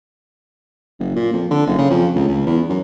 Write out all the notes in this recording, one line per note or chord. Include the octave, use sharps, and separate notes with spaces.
F#1
A#2
F2
D3
F#1
C#3
F2
C#2
C#2
E2
F#2